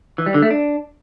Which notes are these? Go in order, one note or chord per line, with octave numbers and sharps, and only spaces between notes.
E3
G3
D3
A3
D4